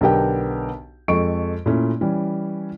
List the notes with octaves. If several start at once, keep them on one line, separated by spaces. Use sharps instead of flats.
B1 D3 B3 G4 A#4 G5
F2 G#3 A4 C#6 D7
A#2 A3 C#4 E4
E3 G3 C#4